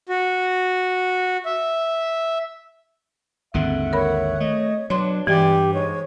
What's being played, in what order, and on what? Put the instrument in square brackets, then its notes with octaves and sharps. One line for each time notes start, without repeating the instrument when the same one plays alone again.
[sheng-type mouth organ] F#4
E5
[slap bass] G#1 D#2 D3 [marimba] C4 [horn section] E5 F#5
[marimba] A#4 B5 [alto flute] C#5
[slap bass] A3 [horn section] D#5
[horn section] B2 D4 [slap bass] F#3 [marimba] C#5 C6
[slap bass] G2 [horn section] B2 G#3 D5 [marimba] E3 [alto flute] G4
[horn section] G#2 G#3 [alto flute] C#5